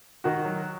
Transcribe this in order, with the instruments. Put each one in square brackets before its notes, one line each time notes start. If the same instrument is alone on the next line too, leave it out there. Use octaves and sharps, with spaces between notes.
[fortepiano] D#3 [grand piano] F#4
[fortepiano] F#3